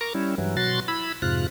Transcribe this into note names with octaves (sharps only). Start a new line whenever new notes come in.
A#4 A#5 C#6 D6
G3 C#4 E4
G2 E3 F#3
B2 F#3 F#4 C6 A6
E4 B5
F2 G#2 C3 F4 F#6